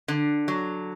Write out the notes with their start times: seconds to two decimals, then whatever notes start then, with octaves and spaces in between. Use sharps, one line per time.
0.08 D3
0.48 F#3